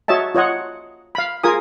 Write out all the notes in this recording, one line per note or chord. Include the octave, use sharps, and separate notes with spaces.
F#4 C#5 D#5 E5 A5
F4 C#5 D#5 F#5
F5 B5
F4 G#4 A#4 G#5 D#6